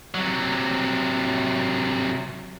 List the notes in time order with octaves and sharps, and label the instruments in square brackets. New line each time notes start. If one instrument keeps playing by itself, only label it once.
[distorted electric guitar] C3 F#3